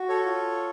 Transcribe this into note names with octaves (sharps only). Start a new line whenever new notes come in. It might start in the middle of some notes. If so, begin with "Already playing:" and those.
Already playing: F#4
A4 C#5
F4